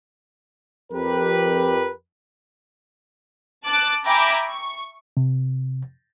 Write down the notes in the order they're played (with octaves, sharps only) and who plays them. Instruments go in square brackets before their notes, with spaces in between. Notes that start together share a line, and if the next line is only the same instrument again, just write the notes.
[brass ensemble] F2 G4 A#4 B4
[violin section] A5 D6 F#6 A6 D7
E5 G5 G#5 A#5 B5 D6
C#6
[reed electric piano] C3